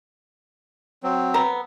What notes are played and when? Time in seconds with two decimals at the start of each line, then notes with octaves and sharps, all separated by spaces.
1.03 F#3 C4
1.34 B3 A#5